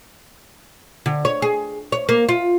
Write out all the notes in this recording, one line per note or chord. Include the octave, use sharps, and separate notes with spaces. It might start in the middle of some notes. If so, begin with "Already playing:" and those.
D3
C#5
G#4
C#5
A#3
F4